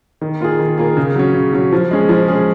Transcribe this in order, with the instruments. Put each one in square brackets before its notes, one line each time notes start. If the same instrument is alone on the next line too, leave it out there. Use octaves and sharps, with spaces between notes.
[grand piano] D#3
A#3 F4 G#4
D#3
A#3 F4 G#4
C#3
F#3 C#4
C#3
F#3 C#4
F3
G#3 C#4 G#4
F3
G#3 C#4 G#4